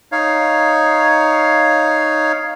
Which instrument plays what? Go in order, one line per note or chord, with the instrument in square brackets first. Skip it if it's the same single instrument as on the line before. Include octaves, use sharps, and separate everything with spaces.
[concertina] D#4 C#5 F5